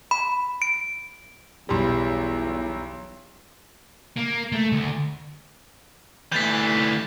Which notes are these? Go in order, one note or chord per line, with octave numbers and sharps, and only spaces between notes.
B5
D7
B1 E2 G3
A#3
A3
D2
D2 E3 G6 A6 B6